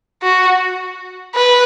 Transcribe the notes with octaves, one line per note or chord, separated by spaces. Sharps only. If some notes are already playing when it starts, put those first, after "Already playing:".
F#4
B4